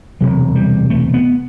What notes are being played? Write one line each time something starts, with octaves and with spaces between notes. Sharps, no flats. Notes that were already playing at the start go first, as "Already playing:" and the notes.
E1 D2 C3 F#3
G3
A3
B3